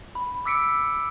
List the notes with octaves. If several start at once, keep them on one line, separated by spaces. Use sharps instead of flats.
B5
D6 E6 B6 C#7 D7